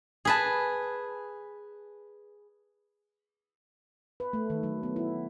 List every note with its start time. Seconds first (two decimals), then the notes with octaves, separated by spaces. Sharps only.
0.25 G#4 B4 A5
4.20 B4
4.33 A3
4.50 D#3
4.63 F#3
4.83 B3
4.96 E4